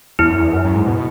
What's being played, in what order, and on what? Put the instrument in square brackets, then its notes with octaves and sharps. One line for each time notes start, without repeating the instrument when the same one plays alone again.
[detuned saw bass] E2 [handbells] E4
[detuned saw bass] F#2
E2
F#2
F#2
G#2
B2